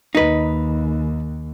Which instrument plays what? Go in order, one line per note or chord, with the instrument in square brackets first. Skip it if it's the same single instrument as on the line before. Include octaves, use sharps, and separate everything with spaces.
[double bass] D#2 [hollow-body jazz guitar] D#4 B4